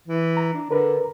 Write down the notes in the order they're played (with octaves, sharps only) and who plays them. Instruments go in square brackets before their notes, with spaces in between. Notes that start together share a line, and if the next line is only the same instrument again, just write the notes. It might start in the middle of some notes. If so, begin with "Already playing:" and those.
[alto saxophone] E3
[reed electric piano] A#5
[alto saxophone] D4
[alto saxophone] D3 [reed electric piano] A#4 B4 A#5